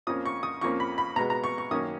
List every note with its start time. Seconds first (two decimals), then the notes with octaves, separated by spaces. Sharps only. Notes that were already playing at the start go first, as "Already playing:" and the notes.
0.07 F2 F3 A#3 C#4 D#6
0.26 C#6
0.43 D#6
0.61 F2 F3 A#3 C#4 C#6
0.80 B5
0.98 B5
1.16 B2 G#3 B3 A#5
1.30 A#5
1.44 C#6
1.58 C#6
1.71 F#2 D#3 A#3 C#4 D#6